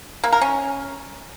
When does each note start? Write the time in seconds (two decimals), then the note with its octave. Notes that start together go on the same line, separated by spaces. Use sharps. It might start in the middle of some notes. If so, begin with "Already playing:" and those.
0.24 A#3
0.32 A#4
0.41 C#4